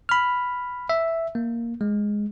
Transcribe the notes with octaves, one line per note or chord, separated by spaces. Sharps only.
B5 F6
E5
A#3
G#3